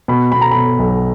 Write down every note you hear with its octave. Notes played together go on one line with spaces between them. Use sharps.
B2 B5
B2 B5
A#5
B2 B5
B1